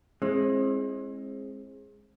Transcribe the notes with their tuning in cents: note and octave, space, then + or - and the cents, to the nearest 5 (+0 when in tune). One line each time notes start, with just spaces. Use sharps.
G#3 +0 C4 +35 E4 +0